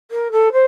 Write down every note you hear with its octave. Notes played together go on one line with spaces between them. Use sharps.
A#4
A4
C5